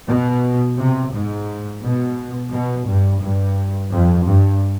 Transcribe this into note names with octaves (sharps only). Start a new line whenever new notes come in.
B2
C3
G#2
B2
B2
G2
G2
F2
G2